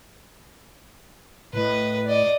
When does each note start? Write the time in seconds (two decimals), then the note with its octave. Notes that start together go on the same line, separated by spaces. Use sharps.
1.53 A2 B4 D#5
2.05 D5 D#5